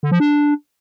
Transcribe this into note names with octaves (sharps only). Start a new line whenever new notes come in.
D3
F3
D4